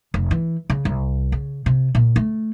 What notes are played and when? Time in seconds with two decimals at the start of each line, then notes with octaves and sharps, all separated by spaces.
0.14 F1
0.31 E3
0.70 C#3
0.85 C2
1.32 C#3
1.66 C3
1.95 A#2
2.16 A3